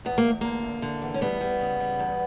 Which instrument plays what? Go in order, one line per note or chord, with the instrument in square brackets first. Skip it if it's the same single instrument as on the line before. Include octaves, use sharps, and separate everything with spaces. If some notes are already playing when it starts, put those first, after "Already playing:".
[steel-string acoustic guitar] E2 B3
A#3
E2
D3 A#3
E2
D3
E2
C#4
G3 B3
G3
C#3
G3
E2